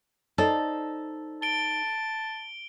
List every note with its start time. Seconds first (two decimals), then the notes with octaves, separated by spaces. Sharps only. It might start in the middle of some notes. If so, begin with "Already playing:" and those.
0.38 D#4 A4 C5 D5
1.42 A5 D7 G7